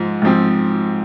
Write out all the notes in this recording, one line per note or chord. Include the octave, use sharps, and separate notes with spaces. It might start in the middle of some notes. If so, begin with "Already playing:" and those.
Already playing: G#2 F3
G#2 F3 C4